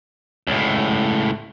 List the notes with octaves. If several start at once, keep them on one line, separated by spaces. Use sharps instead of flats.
C#2 A2